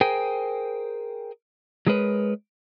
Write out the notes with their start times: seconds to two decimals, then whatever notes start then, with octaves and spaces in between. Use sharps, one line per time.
0.01 G#4 A#4 C5 G5 G#5
1.87 F#3 G#3 G#4 A#4 B4 C#5